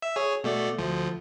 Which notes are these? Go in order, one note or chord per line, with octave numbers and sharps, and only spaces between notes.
E5 E6
G#4 C#5
B2 A3 D5
D2 F3